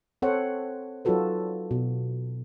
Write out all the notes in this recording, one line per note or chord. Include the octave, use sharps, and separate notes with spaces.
C4 A4 C5 C#5 F#5
F#3 D#4 F4 F#4 A4 B4
B2